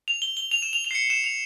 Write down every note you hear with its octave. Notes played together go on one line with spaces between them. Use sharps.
F7
G7
G7
F7
E7
F7
F7
C7
C#7
E7
F7